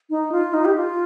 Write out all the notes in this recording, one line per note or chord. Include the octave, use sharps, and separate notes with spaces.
D#4
F4
D#4
G4
F4